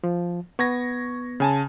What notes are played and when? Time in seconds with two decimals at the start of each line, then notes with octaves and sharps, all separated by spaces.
0.04 F3
0.59 B3 C#6 G#6 A#6
1.40 C#3 G#5 A5